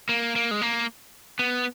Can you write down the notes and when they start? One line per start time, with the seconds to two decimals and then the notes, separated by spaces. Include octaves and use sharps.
0.09 A#3
0.36 A#3
0.51 G#3
0.61 A#3
1.39 B3